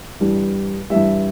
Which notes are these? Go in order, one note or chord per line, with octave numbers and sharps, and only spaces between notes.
G2 E3 G3
G2 E3 G3 E5